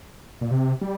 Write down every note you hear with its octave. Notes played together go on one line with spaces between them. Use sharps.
A#2
C3
G3